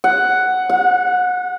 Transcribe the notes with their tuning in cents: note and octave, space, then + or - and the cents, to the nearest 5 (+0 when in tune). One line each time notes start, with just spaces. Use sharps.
F#5 +5
F#5 -30